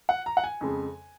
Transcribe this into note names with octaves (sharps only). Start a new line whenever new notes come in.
F#5
A#5
F#5
G#5
F2 C#3 G#3